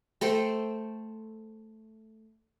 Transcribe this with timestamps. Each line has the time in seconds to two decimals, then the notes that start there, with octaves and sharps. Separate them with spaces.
0.21 A3 A4 C5 G5